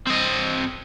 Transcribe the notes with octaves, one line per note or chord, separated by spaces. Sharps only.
C4 D#5